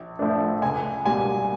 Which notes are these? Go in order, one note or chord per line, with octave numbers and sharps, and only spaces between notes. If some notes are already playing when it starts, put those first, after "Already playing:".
Already playing: A#1
A2 F3 A3 D4
C#2 G#5
B2 G3 A#3 G#5